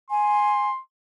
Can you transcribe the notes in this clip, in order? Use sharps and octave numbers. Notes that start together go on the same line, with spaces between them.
G#5 C6